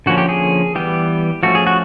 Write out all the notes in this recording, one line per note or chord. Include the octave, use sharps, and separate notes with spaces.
D3 F3 A#3 C#4 F#4
G4
G#4
E3 G3 B3 G4
F3 A3 C#4 F#4
G#4
F#4